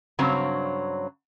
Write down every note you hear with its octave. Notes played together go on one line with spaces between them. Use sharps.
G2 C#3 F#3 C4 C#5